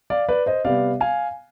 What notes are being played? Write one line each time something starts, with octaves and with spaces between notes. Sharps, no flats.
D5 F5
B4 D5
C5 D#5
C3 G3 B3 D5 F5
F5 G#5